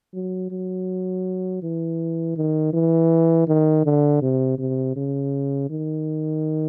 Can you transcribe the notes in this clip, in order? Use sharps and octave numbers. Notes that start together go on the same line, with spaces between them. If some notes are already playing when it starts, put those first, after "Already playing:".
F#3
F#3
E3
D#3
E3
D#3
D3
C3
C3
C#3
D#3